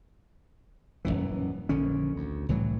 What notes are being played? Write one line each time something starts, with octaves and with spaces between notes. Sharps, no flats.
D#1 A#1 F#2 E3
A#1 D3 D#3 C#4
D2
C2 A2 E3 F#3